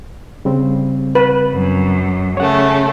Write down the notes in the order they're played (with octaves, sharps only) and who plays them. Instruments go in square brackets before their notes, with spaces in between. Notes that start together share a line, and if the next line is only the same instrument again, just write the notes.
[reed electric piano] C#3 G3 C4
[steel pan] B4
[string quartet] F#2
[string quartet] C#3 A3 [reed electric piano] C#5 F#5